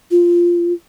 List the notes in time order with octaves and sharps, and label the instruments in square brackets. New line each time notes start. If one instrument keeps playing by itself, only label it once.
[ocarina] F4